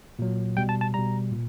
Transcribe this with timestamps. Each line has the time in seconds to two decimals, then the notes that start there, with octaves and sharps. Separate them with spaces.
0.19 A#2 F#3
0.57 B2 G3 G5
0.69 A5
0.81 A5
0.94 B2 G3 A#5
1.31 A#2